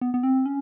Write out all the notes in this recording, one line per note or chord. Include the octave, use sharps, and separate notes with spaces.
B3
B3
C4
C#4